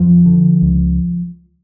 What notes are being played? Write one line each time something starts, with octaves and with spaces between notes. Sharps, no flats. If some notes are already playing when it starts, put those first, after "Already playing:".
Already playing: F2 F3
D3
C#2